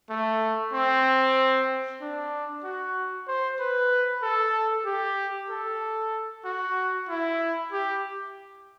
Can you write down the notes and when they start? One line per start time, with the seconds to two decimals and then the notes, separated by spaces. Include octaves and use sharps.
0.10 A3
0.74 C4
2.01 D4
2.64 F#4
3.27 C5
3.59 B4
4.23 A4
4.86 G4
5.50 A4
6.45 F#4
7.09 E4
7.72 G4